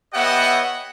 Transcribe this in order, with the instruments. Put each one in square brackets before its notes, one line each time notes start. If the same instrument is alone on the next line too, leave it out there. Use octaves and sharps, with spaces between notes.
[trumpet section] B3 G4 C#5 D#5 E5 F#5